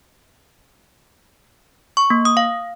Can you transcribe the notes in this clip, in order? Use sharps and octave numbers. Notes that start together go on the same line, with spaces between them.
C#6
A#3
D#6
F5